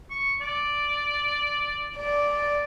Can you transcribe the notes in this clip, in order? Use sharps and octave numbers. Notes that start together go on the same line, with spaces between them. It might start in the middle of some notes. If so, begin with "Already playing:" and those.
C#6
D5
D5